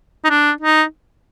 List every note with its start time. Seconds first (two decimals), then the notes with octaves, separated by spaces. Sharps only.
0.25 D#4
0.30 D4
0.61 D#4